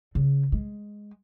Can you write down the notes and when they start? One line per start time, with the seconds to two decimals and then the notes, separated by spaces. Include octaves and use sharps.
0.15 C#3
0.52 G#3